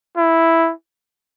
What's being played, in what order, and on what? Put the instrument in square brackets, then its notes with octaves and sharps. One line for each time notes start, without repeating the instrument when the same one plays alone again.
[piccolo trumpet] E4